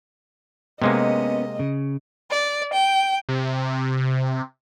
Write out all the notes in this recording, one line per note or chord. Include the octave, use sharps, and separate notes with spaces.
C3 G#3 A#3 B3 C#4 D#5
C#3
D5
G5
C3